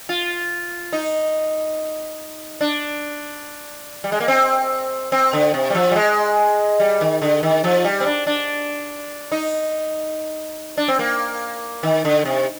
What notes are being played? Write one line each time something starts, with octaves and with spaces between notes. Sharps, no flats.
F4
D#4
D4
G3
G#3
A#3
C4
C4
D3
C3
G3
F3
G3
G#3
G3
D#3
D3
D#3
F3
G3
C4
D4
D4
D#4
D4
C4
A#3
D#3
D3
C3